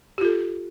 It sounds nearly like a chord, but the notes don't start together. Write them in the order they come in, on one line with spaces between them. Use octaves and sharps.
G4 F4 A4